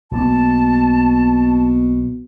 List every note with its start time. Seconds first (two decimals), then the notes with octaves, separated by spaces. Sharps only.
0.11 B1 B2 A#3 C4 A5